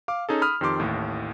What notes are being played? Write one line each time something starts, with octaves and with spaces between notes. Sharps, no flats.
F5 D6
C#4 D#4 G#4 A4
B5 D#6 F6
F2 D#3 G4 C6 D6
A1 D#2 A2